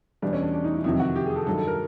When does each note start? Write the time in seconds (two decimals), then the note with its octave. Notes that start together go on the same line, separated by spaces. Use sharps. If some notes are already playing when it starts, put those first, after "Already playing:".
0.22 E2 B2 G3 D4
0.33 C#4
0.42 D4
0.53 D4
0.64 D#4
0.74 E4
0.84 F2 C3 D#3 F#3 E4
1.00 F#4
1.16 G4
1.26 G#4
1.36 A4
1.47 G2 D#3 F#3 A4
1.58 A4
1.67 A#4